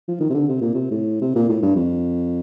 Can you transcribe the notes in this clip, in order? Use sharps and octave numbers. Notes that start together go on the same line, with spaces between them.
F3
D#3
C3
D3
C3
A#2
C3
A2
C3
A#2
A2
G2
F2